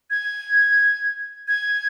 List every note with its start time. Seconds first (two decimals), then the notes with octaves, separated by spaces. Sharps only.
0.10 G#6
1.48 G#6